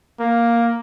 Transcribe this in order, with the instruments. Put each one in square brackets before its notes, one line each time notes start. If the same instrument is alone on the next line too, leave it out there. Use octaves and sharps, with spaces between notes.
[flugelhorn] A#3